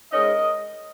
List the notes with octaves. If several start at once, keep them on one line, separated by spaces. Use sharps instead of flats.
G#2 G#3 C#4 A#4 D#5